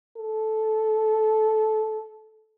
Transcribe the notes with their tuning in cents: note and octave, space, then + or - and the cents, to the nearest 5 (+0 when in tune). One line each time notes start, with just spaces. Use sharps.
A4 -15